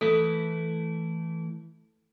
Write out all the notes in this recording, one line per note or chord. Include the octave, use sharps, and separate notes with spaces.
E3 A3 E4 A4 B4